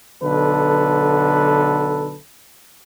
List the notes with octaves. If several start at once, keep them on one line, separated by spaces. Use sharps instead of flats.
B1 D3 A4 B4